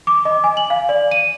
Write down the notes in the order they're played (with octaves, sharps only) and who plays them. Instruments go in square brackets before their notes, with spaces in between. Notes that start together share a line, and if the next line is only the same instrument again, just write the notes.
[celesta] D6
D#5
G#5
F#7
F5
D5
D#7